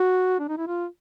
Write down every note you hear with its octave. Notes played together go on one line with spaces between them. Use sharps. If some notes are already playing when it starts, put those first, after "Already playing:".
Already playing: F#4
D4
D#4
E4
F4